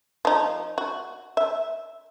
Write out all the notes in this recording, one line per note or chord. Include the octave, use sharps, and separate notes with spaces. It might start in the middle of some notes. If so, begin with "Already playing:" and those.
F3 D#4
F#4
E5